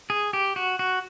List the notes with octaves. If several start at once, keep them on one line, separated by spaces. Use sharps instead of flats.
G#4
G4
F#4
F#4